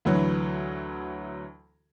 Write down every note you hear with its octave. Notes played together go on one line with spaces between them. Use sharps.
D2 E3 F#3